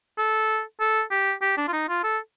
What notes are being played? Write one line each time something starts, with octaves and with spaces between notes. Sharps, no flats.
A4
A4
G4
G4
D4
F4
D#4
F4
A4